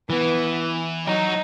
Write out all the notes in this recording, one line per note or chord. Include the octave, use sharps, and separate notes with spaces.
E3 B3
F#3 D#4